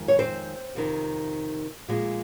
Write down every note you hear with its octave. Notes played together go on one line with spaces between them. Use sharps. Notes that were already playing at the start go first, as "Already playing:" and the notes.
Already playing: F2 D#3 G#3
C#5
C4 C5
F2 C3 D#3
A#2 F3 G#3